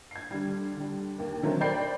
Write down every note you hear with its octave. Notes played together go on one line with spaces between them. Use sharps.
G#6 C7
D3 G3
D3 G3
D#2 A#3
D3 D#3 F#3 A3 A#3 C4
C5 D5 G5 B5 G6 C7